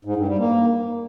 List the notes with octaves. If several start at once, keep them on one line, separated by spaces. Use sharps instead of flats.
G#2
G2
G3
A#3